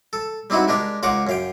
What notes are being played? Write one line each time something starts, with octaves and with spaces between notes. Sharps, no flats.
A4
G3 C4 D#4 E4 F#4
G#3 D4 G4 A#4
C#2 F4 A#4 F#5 C#6 D6
F#2 F5 G5